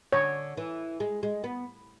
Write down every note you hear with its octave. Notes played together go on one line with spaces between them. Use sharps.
D3 C#5
E3
G#3
G#3
B3